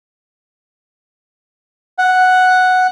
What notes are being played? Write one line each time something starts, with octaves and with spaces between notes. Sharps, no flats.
F#5